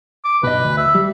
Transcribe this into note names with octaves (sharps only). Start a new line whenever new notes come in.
D6
B1 G2 B4 D#5
D2
E5
G3